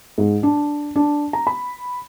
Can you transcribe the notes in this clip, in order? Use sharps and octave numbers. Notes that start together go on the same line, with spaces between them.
G#2
D4
D4
A#5
B5